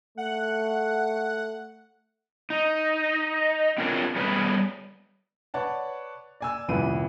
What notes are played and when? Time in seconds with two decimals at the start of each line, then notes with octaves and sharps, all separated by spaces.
0.17 A3 F#5
2.50 D#4
3.78 C4 D4 F4 G#4 A#4 C#5
4.16 G3 A3 B3 G#4 B4 C#5
5.54 B4 C#5 D5 F#5 A5
6.40 D5 G#5 E6
6.68 D#1 C2 F2 B4 D#7